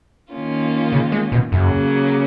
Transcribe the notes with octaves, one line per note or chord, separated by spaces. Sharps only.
D#3 A#3 C#4 F4
C#3
G#3
B2
F#2 C#3 F#3 A#3